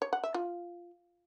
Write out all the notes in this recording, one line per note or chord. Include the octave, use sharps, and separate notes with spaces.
C#5
F#5
E5
F4